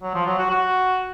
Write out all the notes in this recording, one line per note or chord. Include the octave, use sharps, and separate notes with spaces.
F#3
F3
F#3
F#4
F#4